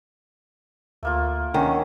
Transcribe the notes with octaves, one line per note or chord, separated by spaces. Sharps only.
D2 A3 A#3 F4
D#3 C#4 D4 F#5